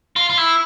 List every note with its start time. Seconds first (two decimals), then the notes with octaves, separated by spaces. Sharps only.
0.16 F4
0.30 F4
0.38 E4